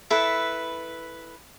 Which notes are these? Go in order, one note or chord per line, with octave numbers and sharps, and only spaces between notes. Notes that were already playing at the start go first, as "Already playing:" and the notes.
E4 A4 B4